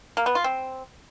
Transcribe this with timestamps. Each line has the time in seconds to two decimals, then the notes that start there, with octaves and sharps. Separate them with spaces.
0.17 A#3
0.26 B3
0.35 F4
0.44 C4